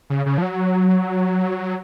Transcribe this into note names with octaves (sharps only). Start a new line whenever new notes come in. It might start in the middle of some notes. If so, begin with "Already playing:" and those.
C#3
C#3
F3
F#3